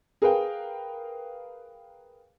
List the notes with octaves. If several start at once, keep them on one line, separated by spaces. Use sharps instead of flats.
G#4 A#4 B4 F5 G5